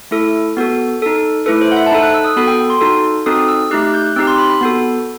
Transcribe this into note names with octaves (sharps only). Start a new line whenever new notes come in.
A3 E4 A4
B3 F#4 A4
D#4 A4
A3 E4 A4 B4
C5
F#5
E5
A5
D#4 A4 B5
F#6
E6
D#6
B3 F#4 A4 B5
G5
C6
D#4 F#4 A4
C4 D#4 F#4 A4 D#6
E6
A3 D#4 G4 F#6
F#6
G6
F#6
C4 D#4 G4 E6
C6
B5
B5
B3 F#4 A4